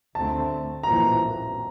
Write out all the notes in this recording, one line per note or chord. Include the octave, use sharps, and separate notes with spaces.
D2 D3 A3 C4 A5
A#1 A2 E3 A#3 A#5